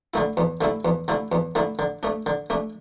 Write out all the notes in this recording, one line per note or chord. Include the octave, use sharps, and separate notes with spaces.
D3 A3 E4
E2
D3 A3 E4
E2
D3 A3 E4
E2
D3 A3 E4
D3
A3 D4
D3
A3 D4